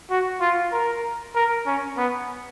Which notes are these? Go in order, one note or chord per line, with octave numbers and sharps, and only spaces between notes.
F#4
F4
A#4
A#4
C#4
B3